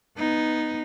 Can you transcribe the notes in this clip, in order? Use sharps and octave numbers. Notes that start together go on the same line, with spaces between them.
B3 D#4